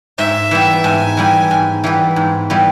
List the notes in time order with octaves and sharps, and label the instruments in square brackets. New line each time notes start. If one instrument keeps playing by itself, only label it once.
[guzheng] G#2 [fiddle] E5
[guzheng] E3 G3 B3
[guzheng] G#2 [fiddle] G#5
[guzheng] E3 G3 B3
G#2
E3 G3 B3
G#2
E3 G3 B3